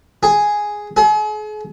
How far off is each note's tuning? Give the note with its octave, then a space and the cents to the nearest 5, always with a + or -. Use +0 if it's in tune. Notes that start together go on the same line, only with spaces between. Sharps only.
G#4 +0
G#4 +40